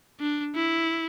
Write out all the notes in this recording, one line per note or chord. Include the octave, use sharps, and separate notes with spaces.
D4
E4